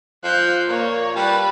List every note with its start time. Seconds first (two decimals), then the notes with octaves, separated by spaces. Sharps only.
0.24 F3 F#6 G6
0.68 A#2 A#3 C#5
1.16 G3 B4 A5